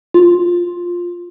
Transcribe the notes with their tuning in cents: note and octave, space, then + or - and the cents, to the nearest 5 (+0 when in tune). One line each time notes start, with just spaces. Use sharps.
F4 +5